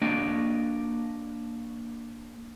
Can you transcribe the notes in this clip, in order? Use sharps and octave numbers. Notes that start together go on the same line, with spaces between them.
A#3 D4 F#4 D5 D#5 G5